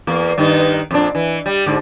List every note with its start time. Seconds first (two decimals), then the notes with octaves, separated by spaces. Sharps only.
0.07 E2 A#3
0.38 G2 D#3 D#4
0.91 F2 A#2 D4
1.15 E3
1.46 G3
1.66 G#2 D3